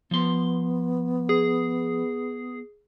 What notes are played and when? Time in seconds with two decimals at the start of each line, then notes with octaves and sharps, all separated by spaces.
0.11 F3 B3 C6
1.29 G#4